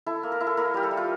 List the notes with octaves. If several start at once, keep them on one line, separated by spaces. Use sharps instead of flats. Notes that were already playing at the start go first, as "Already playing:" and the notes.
E4 A4
A#3
A#4
E4
A4
A#3 A#4
G3 G4
A4
G3
F4